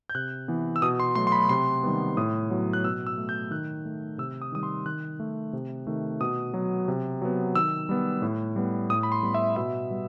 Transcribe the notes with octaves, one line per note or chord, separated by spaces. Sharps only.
G6
C3 F#6
E3 B3
E6
B2 D#6
C6
F#3 A3 C6
C6
B5
C3 C6
D#3 G3 B3
A2 D#6
F#3 B3
F#6
B2 E6
E6
A3
G6
D#3 F#6
A3
C3 E6
D#6
D#3 G3 D#6
C6
D#3 F#6
A3
C3
D#3 A3
B2 D#6
F#3 B3
C3
F#3 B3
D#3 E6
G3 B3
A2
G3 B3
A2 D#6
B5
C6
G3 B3
E5
B2 E5
G3 B3